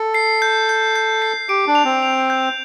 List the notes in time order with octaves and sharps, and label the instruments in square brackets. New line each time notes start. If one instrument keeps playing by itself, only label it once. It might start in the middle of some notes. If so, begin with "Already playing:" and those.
Already playing: [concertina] A4
[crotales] C7
G6
G6
G6
C7
[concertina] G4 [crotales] D7
[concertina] D4
[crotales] F7
[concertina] C4
[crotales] F7
G6